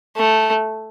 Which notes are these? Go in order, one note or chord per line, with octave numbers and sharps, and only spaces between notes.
A3